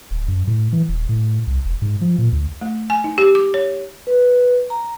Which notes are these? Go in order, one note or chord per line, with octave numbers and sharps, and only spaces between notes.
D1
F#2
A2
E3
D#1
A2
C2
E1
G#2
F3
A#2
D2
A3
G#5
D#4
G4
D6
C#5
B4
A#5